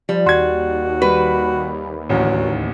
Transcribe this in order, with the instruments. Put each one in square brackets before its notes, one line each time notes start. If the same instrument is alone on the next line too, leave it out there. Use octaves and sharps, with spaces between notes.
[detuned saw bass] F3 [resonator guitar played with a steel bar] G3
[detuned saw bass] D#2 [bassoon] F#4 [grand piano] C6 G#6
[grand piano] G3 [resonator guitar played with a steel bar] B4
[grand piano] A1 D2 [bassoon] F#3